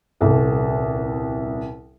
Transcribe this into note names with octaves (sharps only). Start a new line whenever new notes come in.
D#1 C2